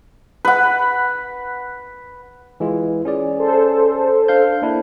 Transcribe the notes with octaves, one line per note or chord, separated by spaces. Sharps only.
B4 F#5
E3 G#3 F4
C#4 G#4 D5
A4 C5
D4 F5 G6
A#3 D4 E4